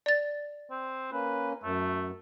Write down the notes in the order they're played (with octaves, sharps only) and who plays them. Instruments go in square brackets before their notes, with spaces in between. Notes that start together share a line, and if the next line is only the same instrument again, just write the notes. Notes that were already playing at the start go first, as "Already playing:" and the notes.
[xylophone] D5 A6
[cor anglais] C4
[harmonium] A#3 C#4 [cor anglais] B4
[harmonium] F#2 [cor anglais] A3